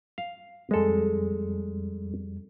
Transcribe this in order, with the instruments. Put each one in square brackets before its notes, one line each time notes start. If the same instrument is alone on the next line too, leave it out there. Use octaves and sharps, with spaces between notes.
[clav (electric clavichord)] F5
[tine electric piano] F2 G3 [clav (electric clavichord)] G#3 A4